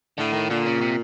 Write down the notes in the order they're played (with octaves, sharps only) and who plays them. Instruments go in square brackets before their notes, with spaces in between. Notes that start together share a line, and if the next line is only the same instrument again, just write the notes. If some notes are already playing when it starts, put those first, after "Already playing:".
[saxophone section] A2 [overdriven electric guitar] D3
[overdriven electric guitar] D#3
[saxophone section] A#2 [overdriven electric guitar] D3
[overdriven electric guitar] C#3
C3